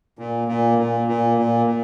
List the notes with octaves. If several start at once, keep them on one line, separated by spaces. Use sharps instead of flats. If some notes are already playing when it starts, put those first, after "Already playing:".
A#2
A#2
A#2
A#2
A#2
A#2